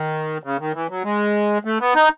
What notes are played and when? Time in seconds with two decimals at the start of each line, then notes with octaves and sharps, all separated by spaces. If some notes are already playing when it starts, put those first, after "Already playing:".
Already playing: D#3
0.44 C#3
0.59 D#3
0.74 E3
0.89 F#3
1.04 G#3
1.65 A3
1.80 B3
1.95 D#4